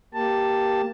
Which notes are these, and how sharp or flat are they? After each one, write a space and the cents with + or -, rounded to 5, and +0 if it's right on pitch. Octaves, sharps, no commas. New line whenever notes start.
A#3 +0 G4 +0 A5 +5